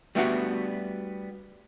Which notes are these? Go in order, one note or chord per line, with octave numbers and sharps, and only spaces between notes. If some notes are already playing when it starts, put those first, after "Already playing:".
G3 A3 B3 D4 D#4 F#4